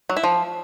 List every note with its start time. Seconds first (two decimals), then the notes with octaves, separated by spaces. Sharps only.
0.09 F#3
0.17 E4
0.24 F3